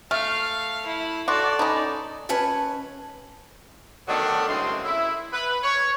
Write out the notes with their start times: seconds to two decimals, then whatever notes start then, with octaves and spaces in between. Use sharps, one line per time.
0.11 A3 F5 F6
0.86 E4
1.28 F#4 A4 D5 C6 D6
1.59 C#4 D#4 A5 B5 D#6
2.29 D#2 C#4 B4 C#5 A5
4.08 D3 D#3 F#3 A3 B3 D4
4.48 F#2 A2 C#3 G#3 C4 C6
4.85 E4
5.32 B4
5.63 C#5